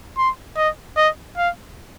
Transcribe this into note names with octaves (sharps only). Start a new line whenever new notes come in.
C6
D#5
D#5
F5